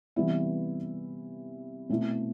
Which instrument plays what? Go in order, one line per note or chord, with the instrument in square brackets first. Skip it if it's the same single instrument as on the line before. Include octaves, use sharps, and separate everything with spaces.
[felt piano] C3 E3 G3 B3 E4
B2 A3 C4 E4